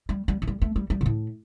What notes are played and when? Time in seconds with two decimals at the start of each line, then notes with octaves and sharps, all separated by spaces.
0.09 G3
0.28 G3
0.42 F3
0.47 G3
0.62 A3
0.76 G3
0.90 G3
1.01 A#2
1.06 A2